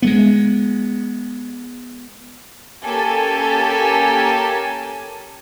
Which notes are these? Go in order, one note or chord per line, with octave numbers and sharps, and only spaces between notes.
G#3 A3 B3
A#3 C#4 G4 A4 G#5 A5